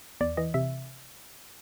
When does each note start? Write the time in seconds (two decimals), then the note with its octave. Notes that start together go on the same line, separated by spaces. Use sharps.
0.21 E2 D5
0.37 E3 D#5
0.54 C3 E5